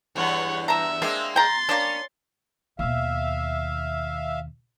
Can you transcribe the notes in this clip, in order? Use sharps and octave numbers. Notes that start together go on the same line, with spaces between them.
E2 G2 C#5 F#5
E5 A5 A#5
G#3 A#3 C4 D4
G5 A#5 C6 A6
A#3 C#4 D4
D#2 B2 E5 F5